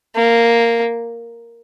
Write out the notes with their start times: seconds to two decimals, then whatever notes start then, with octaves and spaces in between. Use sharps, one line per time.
0.16 A#3